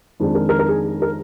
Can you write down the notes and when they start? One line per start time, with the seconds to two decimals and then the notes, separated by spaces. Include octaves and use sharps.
0.20 F2 D#3 G#3 D4
0.35 A#4
0.49 A#4
0.59 A#4
0.68 G#4
1.02 A#4